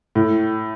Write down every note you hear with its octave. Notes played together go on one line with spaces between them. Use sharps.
A2